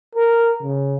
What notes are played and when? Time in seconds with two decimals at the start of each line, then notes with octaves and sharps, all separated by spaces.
0.15 A#4
0.63 C#3